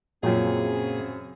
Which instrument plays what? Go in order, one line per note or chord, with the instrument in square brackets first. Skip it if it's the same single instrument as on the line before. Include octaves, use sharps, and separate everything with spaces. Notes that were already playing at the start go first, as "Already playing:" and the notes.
[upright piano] F#2 F#3 [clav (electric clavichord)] A#2 F4 G5 [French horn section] C#3 C4 [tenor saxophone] G#4